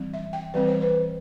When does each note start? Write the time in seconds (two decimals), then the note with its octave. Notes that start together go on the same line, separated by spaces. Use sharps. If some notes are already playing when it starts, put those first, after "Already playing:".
Already playing: E3 G3 C4
0.14 E5
0.33 G5
0.54 E3 G3 C4 B4
0.68 C5
0.81 B4